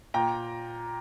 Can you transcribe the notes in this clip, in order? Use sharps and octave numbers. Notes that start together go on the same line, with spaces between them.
A#2 G5 A#5